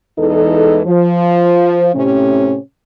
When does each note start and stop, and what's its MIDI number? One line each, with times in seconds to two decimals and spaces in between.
0.19 0.81 40
0.19 0.81 52
0.19 0.81 56
0.19 0.81 63
0.19 0.81 69
0.86 1.90 53
1.95 2.56 45
1.95 2.56 48
1.95 2.56 61